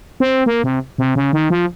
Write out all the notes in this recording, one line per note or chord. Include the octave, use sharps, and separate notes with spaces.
C4
A#3
C3
C3
C#3
D#3
F3